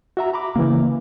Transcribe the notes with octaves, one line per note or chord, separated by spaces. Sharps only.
F#4 E5 A#5
A#5 B5 D6
C#3 E3 A#3